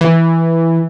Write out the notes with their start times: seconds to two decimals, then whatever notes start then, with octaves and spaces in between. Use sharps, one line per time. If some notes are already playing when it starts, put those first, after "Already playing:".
0.01 E3